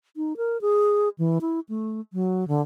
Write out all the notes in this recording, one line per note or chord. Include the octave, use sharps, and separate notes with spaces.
D#4
A#4
G#4
E3
E4
A3
F#3
D3